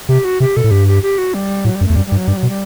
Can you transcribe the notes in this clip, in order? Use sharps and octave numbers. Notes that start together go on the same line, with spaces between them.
C3 G4
F#4
C3 G4
B2 A4
A2
G2 G4
G4
G4
F#4
G3
A2 F#3
G3
F#2
E2 A3
F#2 G3
G3
G2
F#3
G2 G3
F#3
B2
G3